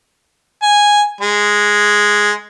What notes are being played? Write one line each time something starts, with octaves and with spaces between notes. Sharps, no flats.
G#5
G#3